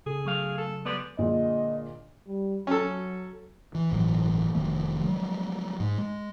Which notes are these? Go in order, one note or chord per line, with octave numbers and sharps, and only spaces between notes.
C#3 G#4 A4
F#3 A3 F5
A4
G3 G#3 B3 D5
A#2 D3 G#3 D#5
G3
F#3 C#4 A4
E3
G1 A2 E3 F#3
F1 D#3 F3 A3
F3 F#3 G#3
G#2
G#3